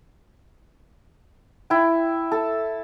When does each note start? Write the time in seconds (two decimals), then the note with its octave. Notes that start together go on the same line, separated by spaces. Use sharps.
1.70 E4 G5
2.32 A4